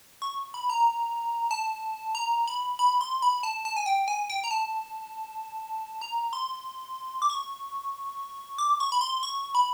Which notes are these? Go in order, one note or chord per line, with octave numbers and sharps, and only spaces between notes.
C#6
B5
A#5
A5
A#5
B5
B5
C6
B5
A5
A5
G#5
G5
G#5
G5
A#5
A5
A#5
C6
D6
C#6
D6
C#6
B5
C6
C#6
B5